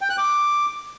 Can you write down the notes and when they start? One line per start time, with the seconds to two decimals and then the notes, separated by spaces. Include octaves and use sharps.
0.01 G5
0.10 F#6
0.18 D6